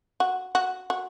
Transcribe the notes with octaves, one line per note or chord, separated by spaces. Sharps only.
F#4
F#4
F#4